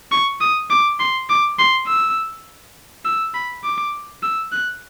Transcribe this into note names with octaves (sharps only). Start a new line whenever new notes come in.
C#6
D#6
D6
C6
D6
C6
E6
E6
B5
D6
E6
F#6